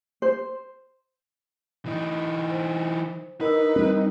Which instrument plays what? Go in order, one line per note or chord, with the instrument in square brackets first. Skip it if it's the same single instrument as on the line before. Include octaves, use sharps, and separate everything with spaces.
[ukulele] C5
[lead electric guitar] E3 D#4
[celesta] C5
[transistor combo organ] D#4 [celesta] A#4 E6 [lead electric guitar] B4
[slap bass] G3 C4